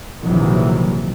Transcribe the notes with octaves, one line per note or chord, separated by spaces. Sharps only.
A#1 C3 D#3 E3 F#3